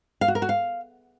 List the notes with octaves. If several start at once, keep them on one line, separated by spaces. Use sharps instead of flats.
F5
F#4
A#4
F#4
F5